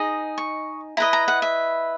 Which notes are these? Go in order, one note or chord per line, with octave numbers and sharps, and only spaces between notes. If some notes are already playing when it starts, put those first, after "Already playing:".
Already playing: D#4 G#4 D#5
C#6
E4 B4 D#5 A#5
A#5
F#5
E5